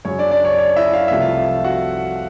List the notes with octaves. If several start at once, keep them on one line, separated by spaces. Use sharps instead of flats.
F#2 C#3 F#3 C#5
D4 D5
D4 D5
C#5
D5
C#5
E4 E5
F5
C2 C3 F3 A3 E5
F4 F5
F#4 F#5